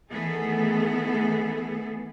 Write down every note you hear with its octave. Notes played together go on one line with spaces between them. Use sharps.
D#3 E3 A3 B3 G#4 A4